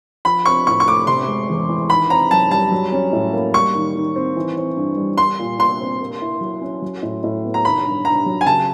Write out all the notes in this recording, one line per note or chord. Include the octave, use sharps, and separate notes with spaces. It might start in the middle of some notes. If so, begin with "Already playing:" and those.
F3 B5
C4 C#6
A2 C#6
C#6
A3 D6
C3 C6
G#3
E2
E3
D#3 B5
C4 A#5
F#2 A5
G3 A5
F#3
C#4
A2
A#3
G3 C#6
D#3
D#3
C4
E3
C4
G2
G3
G3 C6
A#2
A#2 C6
C4
A#3
E4
F#3
C#4
F#3
A2
A2
B3
A#5
D#3 B5
G2
G2 A#5
F#3
G#5
C#3 A5